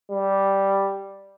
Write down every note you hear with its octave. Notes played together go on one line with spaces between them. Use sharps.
G3